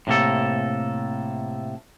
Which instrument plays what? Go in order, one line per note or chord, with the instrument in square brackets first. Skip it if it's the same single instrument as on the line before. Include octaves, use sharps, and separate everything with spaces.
[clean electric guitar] A2 C3 A#3 A4